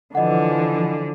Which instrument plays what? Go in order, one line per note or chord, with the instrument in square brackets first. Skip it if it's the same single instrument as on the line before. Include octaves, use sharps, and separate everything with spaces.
[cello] D3 [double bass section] E3 F3 [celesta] D#5 F#5